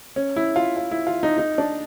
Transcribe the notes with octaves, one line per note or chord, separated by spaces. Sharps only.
C#4
E4
F4
F4
E4
F4
D#4
D#4
D4